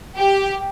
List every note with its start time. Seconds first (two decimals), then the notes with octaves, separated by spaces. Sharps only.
0.17 G4